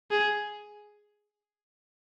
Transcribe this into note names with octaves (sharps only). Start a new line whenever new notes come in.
G#4